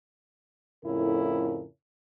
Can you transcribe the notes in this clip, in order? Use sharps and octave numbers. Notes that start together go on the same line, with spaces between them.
F2 A2 C#3 E4 A#4